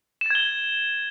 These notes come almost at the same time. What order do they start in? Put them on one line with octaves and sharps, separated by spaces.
E7 A6 G#6 G7